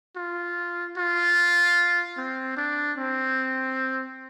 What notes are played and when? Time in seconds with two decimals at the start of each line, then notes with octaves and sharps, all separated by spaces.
0.16 F4
0.97 F4
2.17 C4
2.57 D4
2.98 C4